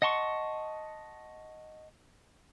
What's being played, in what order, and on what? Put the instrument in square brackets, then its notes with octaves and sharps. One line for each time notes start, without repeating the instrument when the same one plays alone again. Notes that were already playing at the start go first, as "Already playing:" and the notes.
[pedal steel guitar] D#5 F#5 A5 C6 C#6